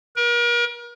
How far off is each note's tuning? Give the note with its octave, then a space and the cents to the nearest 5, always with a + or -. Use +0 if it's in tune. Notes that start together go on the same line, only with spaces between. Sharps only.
A#4 +40